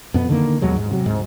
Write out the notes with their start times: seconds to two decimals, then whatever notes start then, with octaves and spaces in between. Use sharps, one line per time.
0.14 F2 B2 B3
0.29 D3 D#3 A#3
0.61 D#2 B2 F#3 G#3
0.76 G#2
0.91 C3 F#3
1.06 D1 G#2